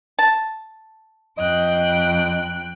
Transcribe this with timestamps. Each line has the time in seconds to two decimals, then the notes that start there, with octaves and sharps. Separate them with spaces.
0.19 A5
1.38 F2 D#5 G5 F#6